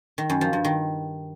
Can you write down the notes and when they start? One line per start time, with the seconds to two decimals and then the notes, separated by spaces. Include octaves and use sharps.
0.18 D#3
0.30 F#2
0.41 F3
0.53 G2
0.65 D#3